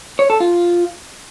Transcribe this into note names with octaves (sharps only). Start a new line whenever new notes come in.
C#5
A4
F4